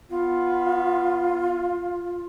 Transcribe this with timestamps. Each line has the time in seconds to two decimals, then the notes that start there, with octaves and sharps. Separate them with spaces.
0.10 B3 F4